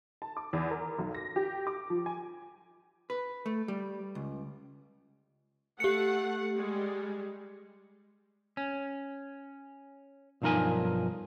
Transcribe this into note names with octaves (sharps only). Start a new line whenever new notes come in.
A5
D6
E2
A#4
B1
A#6
G4
D6
F3
G#5
B4
A3
G3
C#2
A3 G4 F#5 C#7
G3 G#3
C#4
B1 G2 F3 D#4 A#4 G#5